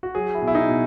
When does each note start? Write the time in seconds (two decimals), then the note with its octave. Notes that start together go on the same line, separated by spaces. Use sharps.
0.03 F#4
0.15 F#3 G#4
0.35 E4
0.42 B2
0.48 E4
0.55 D#4
0.68 B2